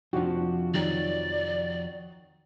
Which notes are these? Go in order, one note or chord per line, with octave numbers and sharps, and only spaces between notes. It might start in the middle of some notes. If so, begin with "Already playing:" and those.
F2 C3 F3 D4 F#4
D#3 F#3 D5